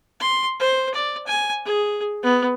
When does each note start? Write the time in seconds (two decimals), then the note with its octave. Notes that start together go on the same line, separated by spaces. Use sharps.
0.20 C6
0.60 C5
0.94 D5
1.27 G#5
1.66 G#4
2.23 B3